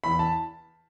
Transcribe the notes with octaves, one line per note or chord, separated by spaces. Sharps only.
E2 B5
A5